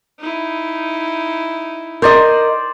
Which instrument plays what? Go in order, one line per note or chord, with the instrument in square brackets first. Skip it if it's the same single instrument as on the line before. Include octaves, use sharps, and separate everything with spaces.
[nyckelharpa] D#4 E4
[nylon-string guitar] A#4 D#5 [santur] C5 D5